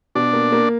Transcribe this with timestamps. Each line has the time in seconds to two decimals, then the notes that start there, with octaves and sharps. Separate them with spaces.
0.15 B2 D4
0.33 A#3
0.52 A#3